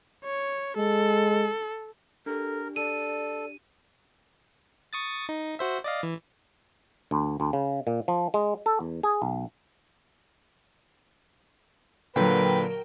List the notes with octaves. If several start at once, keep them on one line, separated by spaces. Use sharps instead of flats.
C#5
G#3 A4
D4 G4 A4 A#4
A4 D5 D#7
C#6 D#6 A6
D#4
F#4 C5 E5
D5 D#5 F5
E3
D2
D2
C#3
A#2
F3
G#3
A4
E2
G#4
B1
A#2 D3 F#3 A#4 B4 G5